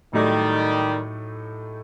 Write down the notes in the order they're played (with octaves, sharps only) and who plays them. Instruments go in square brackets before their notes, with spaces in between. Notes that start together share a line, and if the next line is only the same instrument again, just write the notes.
[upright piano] A2 F#3 A3 D#4 G4 [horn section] D#3 G3